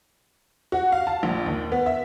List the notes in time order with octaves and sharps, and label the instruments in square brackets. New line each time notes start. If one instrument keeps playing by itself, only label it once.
[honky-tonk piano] F#4
F5
A5
A#1
D#2
B3
E5